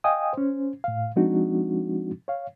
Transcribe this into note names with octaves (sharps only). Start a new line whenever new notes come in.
D#5 F5 G5 G#5 D#6
C#4 C5
A2 F5
F3 G#3 C4 D4 D#4 F#4
C#5 F5